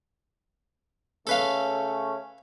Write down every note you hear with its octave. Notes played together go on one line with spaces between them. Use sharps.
C#3 A3 C#4 A4 B4 F5